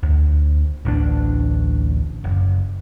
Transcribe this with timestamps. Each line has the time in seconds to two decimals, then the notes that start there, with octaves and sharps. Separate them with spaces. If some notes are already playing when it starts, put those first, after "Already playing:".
0.03 D2
0.85 D1 A1 D2 D4
2.24 F#1